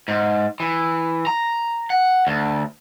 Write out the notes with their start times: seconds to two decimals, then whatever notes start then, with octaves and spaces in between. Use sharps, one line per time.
0.08 G#2
0.60 E3
1.27 A#5
1.90 F#5
2.27 D2